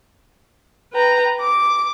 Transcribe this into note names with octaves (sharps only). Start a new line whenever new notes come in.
B4 G5 A#5
D6